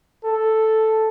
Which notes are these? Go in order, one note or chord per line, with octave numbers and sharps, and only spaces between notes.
A4